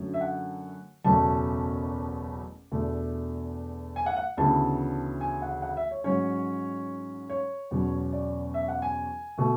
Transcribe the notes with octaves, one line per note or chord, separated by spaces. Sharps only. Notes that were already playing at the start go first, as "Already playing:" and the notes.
Already playing: F#2 D3 F#3 A3
E5
F#5
F#1 E2 B2 A3 C#4 A5
E2 B2 A3 D4
G#5
F#5
F#5
D2 C#3 E3 B3 A5
G#5
F#5
F#5
E5
C#5
G#2 F#3 C#4 C#5
C#5
E2 B2 F#3 C#4
D5
E5
F#5
G#5
B2 A3